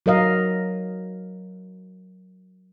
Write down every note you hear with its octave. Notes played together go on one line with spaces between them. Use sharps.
F#3 A#4 D#5 F5